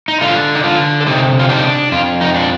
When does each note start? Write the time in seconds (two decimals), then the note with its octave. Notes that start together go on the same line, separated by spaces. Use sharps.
0.08 D#4
0.21 D3 F4
0.55 D#4
0.64 D3 F4
1.01 A4
1.06 C3 D#4 G4
1.39 F4
1.49 D4 D#4 G4
1.92 F2 F4
2.21 D#4
2.35 D4